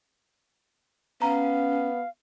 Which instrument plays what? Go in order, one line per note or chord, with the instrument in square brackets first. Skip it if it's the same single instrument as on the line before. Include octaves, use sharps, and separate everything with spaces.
[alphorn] B3 [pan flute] C#4 [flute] F5 [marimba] A#5